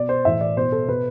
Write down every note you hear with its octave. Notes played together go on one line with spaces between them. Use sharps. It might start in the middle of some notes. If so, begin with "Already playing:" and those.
Already playing: B2 D5
C5
A2 E3 E5
D5
B2 C5
A4
B2 B4